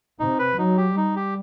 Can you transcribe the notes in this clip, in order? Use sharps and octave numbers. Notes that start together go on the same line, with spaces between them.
C3 D#4
B4
F#3 D#4
G4
G3 D#4
G4